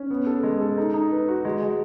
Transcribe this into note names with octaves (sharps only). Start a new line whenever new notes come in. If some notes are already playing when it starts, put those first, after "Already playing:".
Already playing: C#4
B3
A4
G#3
A4
D#4
D#4
B4
F#4
G#3
G#3